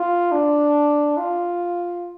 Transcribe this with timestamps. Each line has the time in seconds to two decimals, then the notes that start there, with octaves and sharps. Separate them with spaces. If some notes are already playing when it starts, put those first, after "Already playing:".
Already playing: F4
0.32 D4
1.17 F4